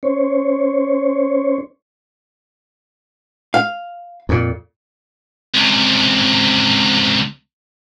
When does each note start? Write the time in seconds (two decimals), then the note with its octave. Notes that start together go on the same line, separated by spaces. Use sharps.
0.03 C#4 C5 C#5
3.54 F5
4.29 F2 A#2
5.55 C#2 C3